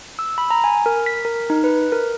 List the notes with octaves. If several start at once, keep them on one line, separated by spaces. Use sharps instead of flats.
E6
B5
A#5
G#5
A#4
B6
A#4
D#4
B4
A#4